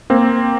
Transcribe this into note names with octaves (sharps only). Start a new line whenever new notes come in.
A#3 C4